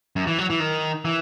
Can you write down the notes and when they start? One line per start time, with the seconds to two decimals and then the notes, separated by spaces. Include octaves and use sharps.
0.16 F#2
0.27 E3
0.38 F#3
0.50 E3
0.60 D#3
1.05 E3